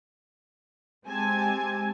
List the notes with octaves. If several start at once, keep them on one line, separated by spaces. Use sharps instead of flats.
G#3 C4 G4 G#5 A5 G#6